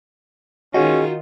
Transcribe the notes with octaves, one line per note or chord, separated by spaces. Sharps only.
D#3 C#4 D#4 F4 F#4 G#4 C#5 D#5